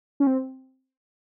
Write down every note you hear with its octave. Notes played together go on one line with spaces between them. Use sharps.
C#4
C4